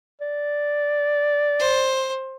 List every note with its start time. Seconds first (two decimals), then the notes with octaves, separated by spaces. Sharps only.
0.21 D5
1.59 C5